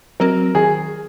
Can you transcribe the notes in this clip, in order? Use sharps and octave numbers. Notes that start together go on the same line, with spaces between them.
F#3 C4 F#4 A#4
D#3 G#4